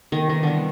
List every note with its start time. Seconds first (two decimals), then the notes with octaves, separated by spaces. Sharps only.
0.12 C3 D#3 E3 G3 B3 D4
0.29 D#3
0.43 D3 D#3